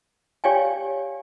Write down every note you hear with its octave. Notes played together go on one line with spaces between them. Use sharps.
G4 C#5 D5 F5 G5 G#5